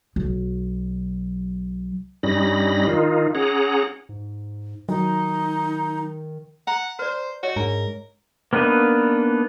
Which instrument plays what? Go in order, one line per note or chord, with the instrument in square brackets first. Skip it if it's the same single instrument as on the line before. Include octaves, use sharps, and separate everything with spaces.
[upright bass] B1 F#3
[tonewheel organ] G2 G3 C#4 D#4 B5 A#6
D#3 D#4 F4
C#4 G#4 F#5 A#5
[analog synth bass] G#2
[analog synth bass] D#3 [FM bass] F#3 [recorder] D#4
[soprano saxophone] F#5 [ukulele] A#5
[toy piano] B4 D5 [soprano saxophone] C5
[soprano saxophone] F#4 [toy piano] C#5 D#5
[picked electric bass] G#2 [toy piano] D4 [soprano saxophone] A#4
[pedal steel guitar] A#3 B3 D4 D#4 B4